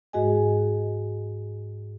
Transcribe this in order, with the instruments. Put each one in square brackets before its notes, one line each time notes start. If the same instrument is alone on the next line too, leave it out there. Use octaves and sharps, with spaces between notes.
[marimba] G#2 G#3 F#4 G#4 D#5 G#5